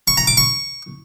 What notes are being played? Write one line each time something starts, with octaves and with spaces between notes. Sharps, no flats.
C#6
A#5
D6
C#6